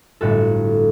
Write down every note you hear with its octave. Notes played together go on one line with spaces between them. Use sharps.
G1 A2 F#4 A4